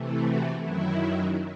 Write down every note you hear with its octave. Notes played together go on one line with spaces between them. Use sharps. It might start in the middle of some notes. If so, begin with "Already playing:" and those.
Already playing: C3 E3 A3
F#4
F#2 D#3 F#3 E4